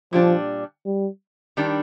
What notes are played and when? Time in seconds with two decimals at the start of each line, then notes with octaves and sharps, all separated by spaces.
0.13 A#2 F3 G3 D4
0.86 G3
1.57 D#3 G3 D4